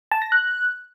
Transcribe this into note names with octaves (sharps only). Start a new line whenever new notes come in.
A5
A#6
F#6